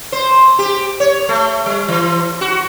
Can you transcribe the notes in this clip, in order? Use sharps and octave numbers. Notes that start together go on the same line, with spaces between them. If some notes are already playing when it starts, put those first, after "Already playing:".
C5
G4
C#5
A3
G3
E3
F#4